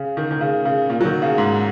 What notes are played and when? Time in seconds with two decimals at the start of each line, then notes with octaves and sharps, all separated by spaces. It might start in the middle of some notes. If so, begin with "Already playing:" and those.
Already playing: C#3
0.17 D#3
0.31 D#3
0.41 C#3
0.65 C#3
0.90 A#2
1.01 F#3
1.05 D#3
1.22 C#3
1.38 G#2